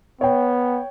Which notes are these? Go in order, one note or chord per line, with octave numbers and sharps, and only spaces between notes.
B3 C#5 G5